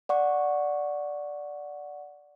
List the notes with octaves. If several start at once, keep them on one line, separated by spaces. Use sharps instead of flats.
D5 F#5 C#6